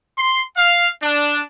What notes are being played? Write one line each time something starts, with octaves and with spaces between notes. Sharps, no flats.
C6
F5
D4